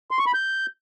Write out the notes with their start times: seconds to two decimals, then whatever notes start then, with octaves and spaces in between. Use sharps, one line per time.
0.11 C6
0.19 C#6
0.27 B5
0.34 G6